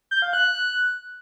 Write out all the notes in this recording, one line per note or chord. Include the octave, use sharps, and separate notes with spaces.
G6
F5
F#6